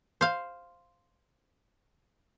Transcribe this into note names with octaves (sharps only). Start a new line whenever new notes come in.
C5 F5